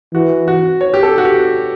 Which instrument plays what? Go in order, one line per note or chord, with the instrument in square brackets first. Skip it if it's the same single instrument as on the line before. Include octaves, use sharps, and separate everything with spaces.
[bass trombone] E3 [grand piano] F#4
[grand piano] F#4
C#5
G4
A4
F#4
G4